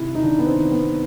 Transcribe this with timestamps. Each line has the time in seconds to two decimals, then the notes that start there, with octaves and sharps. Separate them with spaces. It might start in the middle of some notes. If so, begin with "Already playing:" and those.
Already playing: C3 D#3 E4
0.15 D#4
0.22 D#3 D4
0.39 B3
0.47 C4
0.59 D#3
0.72 B3